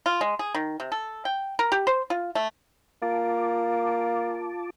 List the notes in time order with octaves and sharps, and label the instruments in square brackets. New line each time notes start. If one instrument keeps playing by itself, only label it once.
[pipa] F4
G#3
G#4
D#3
C3
A4
G5
A#4
G4
C5
F4
A3
[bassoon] A#3 [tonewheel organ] F4 A5 D6